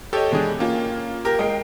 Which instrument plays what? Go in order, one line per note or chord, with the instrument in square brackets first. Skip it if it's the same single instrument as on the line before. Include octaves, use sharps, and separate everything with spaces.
[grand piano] G4 C#5 [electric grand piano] A4 D#5
[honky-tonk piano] B2 E3 [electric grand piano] G#3 D4 G#4
[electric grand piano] A#3 [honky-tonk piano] C#4 F4 G#5
[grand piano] G4 A#4
[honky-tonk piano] G#3 G5 C7 [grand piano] A#4 D#5